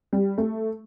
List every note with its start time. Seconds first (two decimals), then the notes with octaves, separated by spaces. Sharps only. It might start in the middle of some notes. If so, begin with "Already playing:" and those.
0.13 G3
0.38 A3